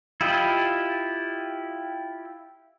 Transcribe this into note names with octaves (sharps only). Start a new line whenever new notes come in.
E4 F4 G4 D#5